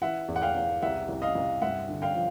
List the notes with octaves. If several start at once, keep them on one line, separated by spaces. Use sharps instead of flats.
E3 E5 F#5
E2
F#5
F5 G5
E2
C2 E5 F#5
C2
D#5 F5
C2
G2 E5 F#5
D3
F5 G5
F3